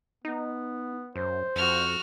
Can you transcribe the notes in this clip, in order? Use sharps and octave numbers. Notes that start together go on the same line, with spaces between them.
B3 D#4
F#2 C5
F2 F#4 F6